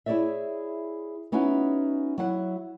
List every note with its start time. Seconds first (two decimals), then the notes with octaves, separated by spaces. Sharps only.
0.06 E4 G#4 C#5 D5 E5
1.32 B3 C#4 D#4 E4 F#4
2.18 F#3 E4 F#5